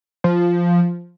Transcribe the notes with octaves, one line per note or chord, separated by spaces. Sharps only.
F3